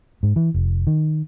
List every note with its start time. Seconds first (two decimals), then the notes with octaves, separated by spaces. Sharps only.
0.23 G#2
0.36 E3
0.54 F1
0.87 D#3